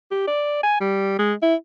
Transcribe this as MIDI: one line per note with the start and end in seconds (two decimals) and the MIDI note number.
0.11 0.25 67
0.27 0.59 74
0.63 0.78 80
0.81 1.17 55
1.19 1.34 56
1.42 1.55 64